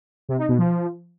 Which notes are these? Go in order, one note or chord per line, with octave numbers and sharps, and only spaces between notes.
C3
D#4
B2
F3